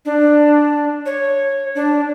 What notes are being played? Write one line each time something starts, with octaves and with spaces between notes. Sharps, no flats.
D4
C#5
D4